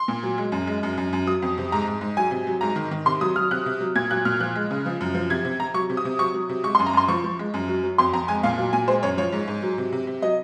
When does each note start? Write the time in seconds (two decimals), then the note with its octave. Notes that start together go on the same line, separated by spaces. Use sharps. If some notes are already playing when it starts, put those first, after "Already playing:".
Already playing: C6
0.08 A#2
0.23 F#3
0.38 G#3
0.52 F#2
0.67 G#3
0.83 F#2
0.98 F#2
1.13 F#2
1.27 F#3 D#6
1.42 F2
1.58 C3
1.72 G#2 A#5
1.87 G#2
2.01 G#2
2.17 F#3 G#5
2.31 C3
2.47 F#3
2.61 G#2 A#5
2.76 D#3
2.91 D#3
3.06 C3 C6
3.21 F#3 D#6
3.36 F#3 F6
3.51 C3 F#6
3.66 C3
3.81 F#3
3.95 A#2 G#6
4.11 F#3 F#6
4.25 A#2 F6
4.40 F3 F#6
4.55 G#3
4.71 C#3
4.86 F3
5.01 F#2
5.14 F3
5.30 C3 G#6
5.45 C3
5.59 C3 A#5
5.74 F#3 C#6
5.90 C3
5.97 D#6
6.05 C3
6.19 F#3 C#6
6.34 F#3
6.49 C3
6.64 G#3 C#6
6.75 F#2 C6
6.86 A#5
6.93 F#2 C6
7.08 F3 C#6
7.24 F3
7.39 G#3
7.54 F#2
7.68 F#3
7.84 F#3
7.98 F2 C6
8.13 F2 A#5
8.28 G#3 G#5
8.43 A#2 F5
8.58 F#3
8.73 A#2 G#5
8.88 G#3 C5
9.03 F#2 C#5
9.18 F3 C#5
9.32 G#2
9.47 G#2
9.62 F#3
9.78 C3
9.93 C3
10.07 C3
10.22 F#3 D#5